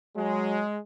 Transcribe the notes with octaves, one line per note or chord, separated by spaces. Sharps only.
F#3 G#3